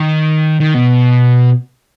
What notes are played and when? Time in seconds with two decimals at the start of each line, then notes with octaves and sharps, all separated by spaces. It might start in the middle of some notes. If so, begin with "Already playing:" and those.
Already playing: D#3
0.60 D#3
0.74 B2